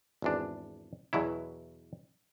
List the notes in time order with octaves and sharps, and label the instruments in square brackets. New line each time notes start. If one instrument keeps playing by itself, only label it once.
[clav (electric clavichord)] G#1 E2 D4
E2 B2 F#3 E4